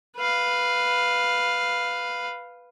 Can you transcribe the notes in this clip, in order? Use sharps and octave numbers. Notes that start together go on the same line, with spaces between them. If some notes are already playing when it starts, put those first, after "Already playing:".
B4 F5